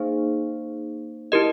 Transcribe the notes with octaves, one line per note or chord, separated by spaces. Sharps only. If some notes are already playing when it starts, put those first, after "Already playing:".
Already playing: A#3 D#4 G#4 C5 F5
E4 G4 A#4 D#5